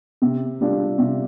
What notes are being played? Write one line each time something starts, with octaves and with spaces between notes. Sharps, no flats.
C3
G3 D4 F4
C3